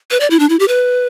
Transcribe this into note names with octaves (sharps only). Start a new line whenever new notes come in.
B4
D5
E4
D4
E4
G4
B4